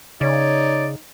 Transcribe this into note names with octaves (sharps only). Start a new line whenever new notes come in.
C#3 D#4 C#5 D5